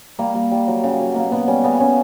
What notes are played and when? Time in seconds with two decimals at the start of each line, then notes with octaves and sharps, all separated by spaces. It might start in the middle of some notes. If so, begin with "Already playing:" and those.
0.19 G3 A#3
0.34 G3
0.52 G3
0.67 F#3
0.84 C#3
1.00 F#3
1.15 B2 A#3
1.32 B2 B3
1.48 G3 C#4
1.64 C#3 B3
1.80 C#3 C#4